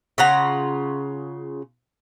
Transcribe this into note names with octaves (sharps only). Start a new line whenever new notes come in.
C#3 F4 F#5 A#5